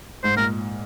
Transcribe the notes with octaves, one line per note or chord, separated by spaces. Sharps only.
G#2 C5
A#2 A#4